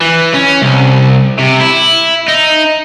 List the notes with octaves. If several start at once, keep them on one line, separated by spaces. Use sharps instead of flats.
E3
C#4
C2
C3
E4
D#4